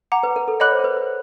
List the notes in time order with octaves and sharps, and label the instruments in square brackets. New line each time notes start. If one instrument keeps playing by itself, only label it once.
[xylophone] F#5 A#5 D6
[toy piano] B4
A#4
A4
[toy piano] C#5 [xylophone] D#5 F#5 B5 D6 F#6
[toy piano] C5
A#4
B4
B4